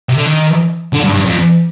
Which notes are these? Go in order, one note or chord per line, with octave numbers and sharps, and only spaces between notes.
C3
D3
D#3
D3
G2
G2
F2